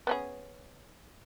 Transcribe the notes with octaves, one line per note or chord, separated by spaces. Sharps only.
B3 C#4 G#4